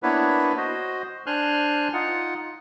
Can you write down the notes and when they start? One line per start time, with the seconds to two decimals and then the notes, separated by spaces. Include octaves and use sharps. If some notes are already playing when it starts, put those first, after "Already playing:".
0.03 A#3 B3 D4 E4 B4 C#5
0.57 F#4 C5 D#5
1.26 D4 C5 G#5 C6 F6 F#6
1.93 D#4 F4 F#5